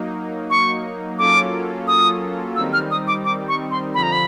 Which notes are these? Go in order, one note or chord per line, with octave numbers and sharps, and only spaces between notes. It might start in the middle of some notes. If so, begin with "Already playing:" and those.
Already playing: F#3 A#3 D#4
C#6
F#3 A#3 C#4 F4 A4 D6
D#6
D#3 G3 C4 D#4 E6
F6
D#6
D6
D6
C#6
C6
F2 D3 F3 B5
A#5
B5